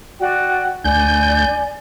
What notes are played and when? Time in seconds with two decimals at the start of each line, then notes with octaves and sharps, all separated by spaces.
0.20 F#4 D5 G5
0.84 D2 D5 G#5 G6